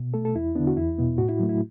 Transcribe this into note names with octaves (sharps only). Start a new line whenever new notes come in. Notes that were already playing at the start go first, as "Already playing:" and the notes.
Already playing: B2
A3 A4
A4
E2 E4
D3 B3 D4
F#4
E2 E4
B2 B3
A2 F#4
E4
F#3 A3
E4